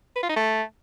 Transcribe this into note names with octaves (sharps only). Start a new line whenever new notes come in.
B4
F4
D#4
A3